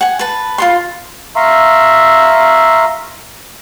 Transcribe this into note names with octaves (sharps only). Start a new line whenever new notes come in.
F#5 G#5
B4 A5
F4 A4 C6
E5 F5 A#5 C6 C#6 E6